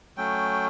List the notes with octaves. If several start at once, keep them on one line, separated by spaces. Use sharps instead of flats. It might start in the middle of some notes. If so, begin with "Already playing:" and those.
F#3 A3 C#4 G5